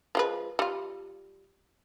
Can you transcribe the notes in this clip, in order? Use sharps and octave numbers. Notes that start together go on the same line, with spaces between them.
F3 G#3 B4
G3 F4